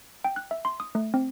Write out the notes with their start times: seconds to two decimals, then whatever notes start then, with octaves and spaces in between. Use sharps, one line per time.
0.24 G5
0.36 F#6
0.51 E5
0.65 C6
0.80 D#6
0.95 A3
1.14 C4